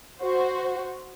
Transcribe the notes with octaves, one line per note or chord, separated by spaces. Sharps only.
F#4 C5